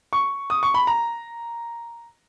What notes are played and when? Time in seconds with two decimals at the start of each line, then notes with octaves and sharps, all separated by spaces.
0.13 C#6
0.50 D#6
0.63 C#6
0.74 B5
0.87 A#5